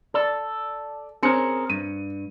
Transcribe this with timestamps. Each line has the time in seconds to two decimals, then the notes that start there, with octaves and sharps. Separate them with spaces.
0.14 A4 D5
1.23 C4 C#4 G#4 A#4 C#7
1.70 G2 D#7